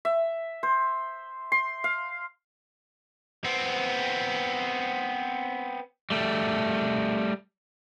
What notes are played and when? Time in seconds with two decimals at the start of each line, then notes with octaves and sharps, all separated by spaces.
0.05 E5
0.63 C5
1.52 C6
1.84 F5
3.45 B3 C4
6.10 G3 A3